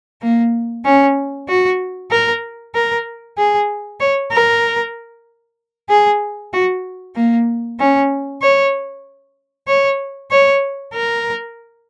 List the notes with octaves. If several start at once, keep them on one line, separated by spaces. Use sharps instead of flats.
A#3
C#4
F#4
A#4
A#4
G#4
C#5
A#4
G#4
F#4
A#3
C#4
C#5
C#5
C#5
A#4